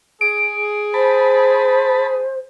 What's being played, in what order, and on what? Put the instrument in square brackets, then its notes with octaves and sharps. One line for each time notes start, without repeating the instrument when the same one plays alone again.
[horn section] G#4 [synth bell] D7
[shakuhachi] C5 [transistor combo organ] A5 B5